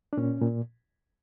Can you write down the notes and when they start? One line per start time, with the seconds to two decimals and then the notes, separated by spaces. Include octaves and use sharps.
0.13 D4
0.17 A#2 C#4
0.41 A#2